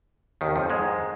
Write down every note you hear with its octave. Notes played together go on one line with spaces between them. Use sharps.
D#2 D#3
F2 F3
G#2 G#3